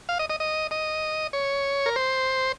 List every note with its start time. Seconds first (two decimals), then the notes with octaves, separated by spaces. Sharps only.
0.09 F5
0.19 D#5
0.30 D#5
0.40 D#5
0.71 D#5
1.33 C#5
1.86 A#4
1.96 C5